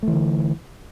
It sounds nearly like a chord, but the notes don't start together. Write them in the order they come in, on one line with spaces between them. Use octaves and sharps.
A3 E3 D3